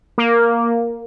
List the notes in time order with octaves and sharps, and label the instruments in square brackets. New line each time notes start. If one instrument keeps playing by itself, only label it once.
[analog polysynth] A#3